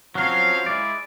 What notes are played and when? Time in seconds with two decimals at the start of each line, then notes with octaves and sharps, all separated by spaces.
0.15 F3 F#3 C4 C#4 F5
0.66 G#3 E4 D5